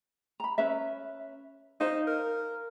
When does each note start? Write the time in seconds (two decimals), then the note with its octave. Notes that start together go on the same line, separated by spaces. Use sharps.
0.40 A#5 B5
0.58 C#4 B4 E5
1.81 D#4 C5 F5
2.07 A#4